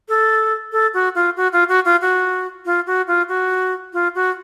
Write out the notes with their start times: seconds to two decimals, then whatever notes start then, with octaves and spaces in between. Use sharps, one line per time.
0.09 A4
0.72 A4
0.94 F#4
1.15 F4
1.37 F#4
1.53 F4
1.69 F#4
1.85 F4
2.01 F#4
2.65 F4
2.87 F#4
3.07 F4
3.29 F#4
3.93 F4
4.15 F#4